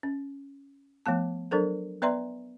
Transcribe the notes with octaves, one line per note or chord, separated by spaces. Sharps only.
C#4
F3 A3 B3 A5
F#3 D4 A4 A#4 C5
B3 B4 D5 E5 A#5 C6